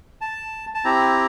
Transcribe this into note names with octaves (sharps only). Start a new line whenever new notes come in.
A5
A5
C4 E4 G4 A#5